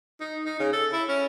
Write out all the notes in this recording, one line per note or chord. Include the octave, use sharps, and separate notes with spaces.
D#4
D#4
C#3
A4
E4
C#4